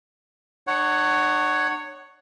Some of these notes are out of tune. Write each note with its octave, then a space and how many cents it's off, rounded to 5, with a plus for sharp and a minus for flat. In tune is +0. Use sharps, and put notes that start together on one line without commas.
D4 +45 C#5 +0 F#5 +10